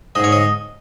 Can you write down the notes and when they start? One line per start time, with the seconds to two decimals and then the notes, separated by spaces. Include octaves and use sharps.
0.15 G#2 D#5
0.24 C#5
0.32 D#5